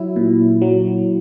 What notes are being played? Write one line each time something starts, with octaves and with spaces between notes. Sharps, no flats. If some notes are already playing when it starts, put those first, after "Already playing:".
Already playing: F#3 E4
A#2
F#3